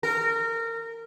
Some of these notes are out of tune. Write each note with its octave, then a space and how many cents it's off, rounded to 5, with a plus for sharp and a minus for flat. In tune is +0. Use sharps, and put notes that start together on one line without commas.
A#4 -25